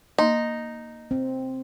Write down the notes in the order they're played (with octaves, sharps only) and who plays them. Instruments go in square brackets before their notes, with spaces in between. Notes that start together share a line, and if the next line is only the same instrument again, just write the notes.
[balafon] A#3 C6 [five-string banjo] D#4
[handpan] C4